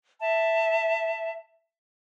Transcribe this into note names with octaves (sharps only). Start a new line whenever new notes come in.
E5 A5